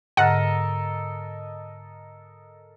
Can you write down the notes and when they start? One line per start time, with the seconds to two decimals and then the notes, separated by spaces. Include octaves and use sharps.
0.17 G#2 D3 A4 A#4 D#5 F#5